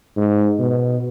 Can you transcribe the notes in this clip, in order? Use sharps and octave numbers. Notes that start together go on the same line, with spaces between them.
G#2
B2